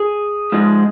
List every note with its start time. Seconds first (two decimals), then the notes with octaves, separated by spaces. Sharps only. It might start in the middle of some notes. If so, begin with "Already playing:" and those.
Already playing: G#4
0.52 G#2 F3 G#3